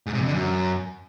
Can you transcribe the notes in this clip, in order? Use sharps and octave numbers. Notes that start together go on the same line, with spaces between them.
G#2
C3
F2
D3
F#2